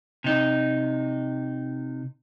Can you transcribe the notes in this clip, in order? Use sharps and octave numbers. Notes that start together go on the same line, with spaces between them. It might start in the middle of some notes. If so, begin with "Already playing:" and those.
C3 D#4